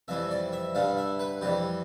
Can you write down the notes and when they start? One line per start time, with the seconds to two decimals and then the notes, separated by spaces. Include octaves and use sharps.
0.08 F2 E3 G3 E5
0.31 D5
0.53 E5
0.75 G2 D3 G3 F5
0.97 E5
1.19 B4
1.41 F2 E3 G3 G4